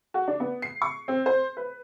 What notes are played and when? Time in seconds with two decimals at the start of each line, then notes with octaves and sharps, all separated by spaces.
0.14 F#4
0.28 D4
0.40 B3
0.62 C7
0.82 C#6
1.08 C4
1.26 C5
1.57 B4